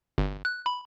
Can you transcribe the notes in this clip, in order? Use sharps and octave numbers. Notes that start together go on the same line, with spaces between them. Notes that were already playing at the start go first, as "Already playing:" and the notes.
G1
F#6
B5